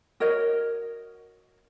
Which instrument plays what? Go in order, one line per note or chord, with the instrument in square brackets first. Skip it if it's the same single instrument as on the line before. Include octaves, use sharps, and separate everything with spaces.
[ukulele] F#4 A#4 C#5 D#5